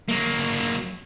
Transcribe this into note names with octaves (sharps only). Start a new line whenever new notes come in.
F#3 A#3